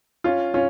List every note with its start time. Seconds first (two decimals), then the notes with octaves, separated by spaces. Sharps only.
0.24 C#4 F4
0.54 C#4 F4